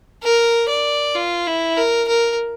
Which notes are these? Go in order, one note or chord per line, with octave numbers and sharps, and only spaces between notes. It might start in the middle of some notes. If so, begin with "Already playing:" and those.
A#4
D5
F4
E4
A#4
A#4